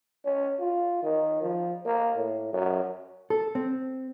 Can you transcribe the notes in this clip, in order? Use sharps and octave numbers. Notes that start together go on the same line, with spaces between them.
C#4
F4
D#3
F3
A#3
A2
F#2
A4
C4